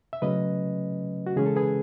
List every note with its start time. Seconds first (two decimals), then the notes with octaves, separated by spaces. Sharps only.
0.13 E5
0.22 C#3 F#3 A3 C#4 B4 D#5
1.26 F#4
1.37 C#3 E3 G#3 C#4 G#4
1.46 A4
1.56 G#4 B4